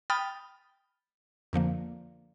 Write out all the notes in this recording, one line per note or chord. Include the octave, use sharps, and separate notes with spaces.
G5 B5 D#6 F6 A6
F2 D3 F3 A#3